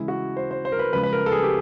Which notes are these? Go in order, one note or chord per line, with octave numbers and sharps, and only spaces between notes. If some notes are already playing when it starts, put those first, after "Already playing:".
Already playing: C#3 E3 G#3 E4
F#4
C5
C5
C5
A#4
B4
C#3 F3 G#3 B4
B4
A#4
A4
G#4
G4